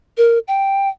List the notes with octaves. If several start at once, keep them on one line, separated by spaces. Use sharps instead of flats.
A#4
G5